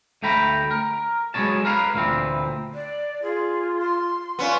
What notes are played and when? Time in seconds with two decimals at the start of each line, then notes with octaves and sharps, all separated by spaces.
0.23 D2 A3 G5 A#5 B5
0.71 A#4
1.34 F#3 G#3 B3 C#4 C#5 A5
1.65 A#4 B4 F5
1.95 D2 A#2 E3 C4
2.73 D5
3.22 F4 G#4
3.80 C6
4.39 B3 C#4 F4